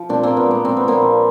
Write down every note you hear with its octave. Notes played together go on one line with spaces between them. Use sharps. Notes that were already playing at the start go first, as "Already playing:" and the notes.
Already playing: F3
A#2 C4 D4
A#2 A#3 C4
B3
G#3 A#3
F3 C4
B3
A#2 A#3 C4
F3